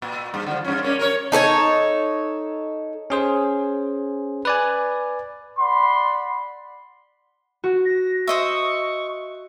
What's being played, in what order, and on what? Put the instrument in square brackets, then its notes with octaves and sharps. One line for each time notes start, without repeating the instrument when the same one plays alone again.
[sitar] A#2
G2
D3 F3
G2 C#4
A#3 C#4 D4
A#4 C#5
[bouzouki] D#4 A4 C5 C#5
[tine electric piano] C#4 G#4 C5
B4 D5 G#5
[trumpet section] D5 F#5 B5 C6
[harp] F#4
[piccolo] A#6
[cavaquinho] C5 D#5 E5 [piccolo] C#6